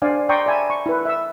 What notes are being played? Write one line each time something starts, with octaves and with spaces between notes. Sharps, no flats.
D4 C5 D5 F5 G#5
D5 G5 A#5 C6 C#6 D#6
D5 E5 G#5 A5 B5
C#6
E4 B4
E5 E6